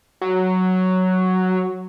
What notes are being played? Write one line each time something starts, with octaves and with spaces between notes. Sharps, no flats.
F#3